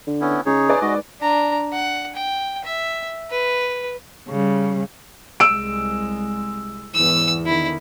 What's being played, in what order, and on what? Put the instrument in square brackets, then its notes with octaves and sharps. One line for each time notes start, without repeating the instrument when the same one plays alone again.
[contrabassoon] D3
[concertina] B3 C#4 E4
[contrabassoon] C#3 [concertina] D#4 G#4 C#5
[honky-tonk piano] B4 D5 G#5
[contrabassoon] G#2 [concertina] F#4 D#5
[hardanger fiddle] D4 A#5
F#5
G5
E5
B4
[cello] C#3 G3
[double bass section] C2 G#3 [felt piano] E6 D7
[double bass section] E2 G#2 E3 [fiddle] E6
[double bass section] D3 D#3 [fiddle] E4